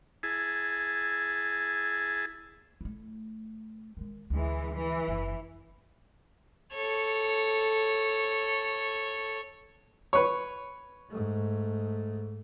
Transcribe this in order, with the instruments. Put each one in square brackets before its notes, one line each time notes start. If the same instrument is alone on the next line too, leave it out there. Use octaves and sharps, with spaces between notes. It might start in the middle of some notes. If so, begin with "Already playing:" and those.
[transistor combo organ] E4 G#4 A5
[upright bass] A3 E4
D#3 G#3
[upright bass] D2 [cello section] E3 G#3
[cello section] E3
[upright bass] F#1 E2
[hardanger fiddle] A4 C#5
[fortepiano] B4 C#5
[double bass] G#2 A3